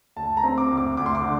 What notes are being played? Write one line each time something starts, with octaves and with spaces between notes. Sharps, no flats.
D2 A5
A#5
C4
D6
D2
D6
D2 D6
C6
D6
D3